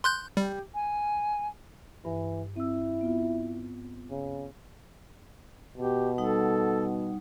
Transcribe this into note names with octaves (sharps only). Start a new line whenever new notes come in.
C6 F#6 G6
G3 G4
G#5
G2 E3
C4 E4 E6
B3 F4
C#3
B2 G4
G3 D#4 A4 F#5